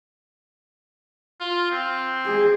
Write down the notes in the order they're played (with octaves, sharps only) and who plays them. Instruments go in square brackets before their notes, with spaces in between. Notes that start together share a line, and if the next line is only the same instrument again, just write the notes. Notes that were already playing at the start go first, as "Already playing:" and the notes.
[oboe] F4
C4
[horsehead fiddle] G#3 G#4